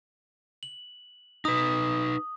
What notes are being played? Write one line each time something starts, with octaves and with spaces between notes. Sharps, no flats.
F#7
D#4 B4 D#6